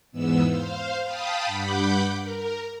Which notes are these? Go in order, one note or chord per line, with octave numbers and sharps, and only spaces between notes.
E2 G#2 B3 E6
C5 F5
F5 G5 A5 B5 D#6
G2 F#5 B5 D6 G6
A#4